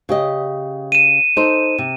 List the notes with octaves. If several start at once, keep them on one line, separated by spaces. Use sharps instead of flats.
C#3 G4 D#5
D#7 E7
D#4 A4 C5
C3